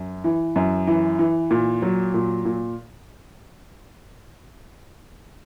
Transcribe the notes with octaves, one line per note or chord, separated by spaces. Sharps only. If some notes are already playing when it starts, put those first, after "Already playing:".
Already playing: F#2
E3
F#2
E3
E3
A#2
F#3
A#2
A#2